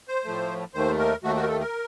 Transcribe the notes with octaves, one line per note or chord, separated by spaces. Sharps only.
C5
A2 F3 A3
D#2 D#3 A3 C5
A#4
D#2 D#3 A3 F#4
F#4
A#4
A4
A#4